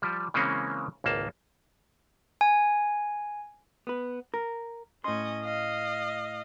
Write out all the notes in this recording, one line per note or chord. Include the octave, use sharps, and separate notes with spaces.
F3 G3
C#3 E3 G#3 A#3 C4 C#4
G#1 C#2 A#3 A5
G#5
B3 B4
A#4
A2 C#4 D#5 C6
D#5 F5